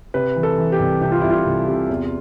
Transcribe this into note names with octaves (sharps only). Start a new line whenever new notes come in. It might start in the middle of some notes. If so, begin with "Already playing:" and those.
C3 B4
E3
A4
E3
G4
C2
C3 G4
F4
C2 E4
F4
C2
C3
E2